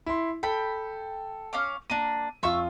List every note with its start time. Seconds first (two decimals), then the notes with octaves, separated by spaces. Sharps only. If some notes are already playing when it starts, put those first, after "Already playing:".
0.06 E4 C6
0.43 A4 G5 B5
1.53 C#4 F5 D6
1.90 A#3 D4 D#7
2.43 F2 F4 E5 C#6 E6